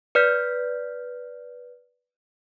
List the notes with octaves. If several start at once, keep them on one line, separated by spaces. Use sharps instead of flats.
B4 D5 F6 G6 B6